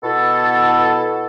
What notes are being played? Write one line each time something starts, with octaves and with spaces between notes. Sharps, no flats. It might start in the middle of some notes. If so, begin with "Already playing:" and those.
B2 B3 E4 A4